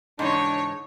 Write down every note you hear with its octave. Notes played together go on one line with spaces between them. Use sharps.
G#2 C#3 E3 D4 D#4 C#5